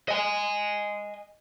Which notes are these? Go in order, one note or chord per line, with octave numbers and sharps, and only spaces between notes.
D#5 G#5